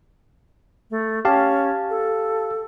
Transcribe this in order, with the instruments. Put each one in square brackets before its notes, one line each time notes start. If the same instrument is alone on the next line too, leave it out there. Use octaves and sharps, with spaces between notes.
[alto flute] A3
[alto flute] C#4 [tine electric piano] G4 F5 A5
[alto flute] A4